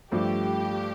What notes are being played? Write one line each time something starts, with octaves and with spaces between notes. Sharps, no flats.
G2 F3 A3 G4